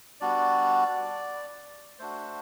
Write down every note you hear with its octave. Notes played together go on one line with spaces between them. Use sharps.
G3 B3 D4 F#4 D5
A3 D4 F#4 C5